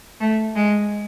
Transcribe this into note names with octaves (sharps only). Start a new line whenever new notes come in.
A3
G#3